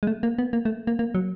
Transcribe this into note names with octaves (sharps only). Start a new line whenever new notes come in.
G#3
A3
A#3
B3
A#3
A3
A#3
A#3
F#3